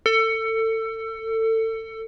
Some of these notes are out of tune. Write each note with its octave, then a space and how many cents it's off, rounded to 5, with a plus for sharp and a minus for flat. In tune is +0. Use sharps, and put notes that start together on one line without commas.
A4 +25